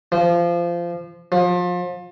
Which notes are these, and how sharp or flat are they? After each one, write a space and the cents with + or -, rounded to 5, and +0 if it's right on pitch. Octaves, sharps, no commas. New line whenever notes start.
F3 -20
F3 +30